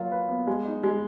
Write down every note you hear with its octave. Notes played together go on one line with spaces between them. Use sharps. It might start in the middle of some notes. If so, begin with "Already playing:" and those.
Already playing: F#3 A#3 F4
B4
B3
G#3
D#4
G#3